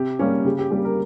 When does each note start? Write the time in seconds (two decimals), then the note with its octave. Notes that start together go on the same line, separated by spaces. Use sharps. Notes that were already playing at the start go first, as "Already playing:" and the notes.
Already playing: C3 G4
0.19 G3 A#3 C#4
0.45 C#3 G4
0.59 G4
0.71 G3 A#3 G4
0.85 A#4